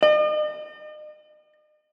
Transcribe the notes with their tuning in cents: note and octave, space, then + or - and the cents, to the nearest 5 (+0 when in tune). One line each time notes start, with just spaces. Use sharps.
D#5 -40